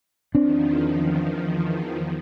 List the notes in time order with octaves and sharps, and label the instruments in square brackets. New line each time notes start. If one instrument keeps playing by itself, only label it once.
[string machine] E2 D#3 F3 [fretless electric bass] C4 D4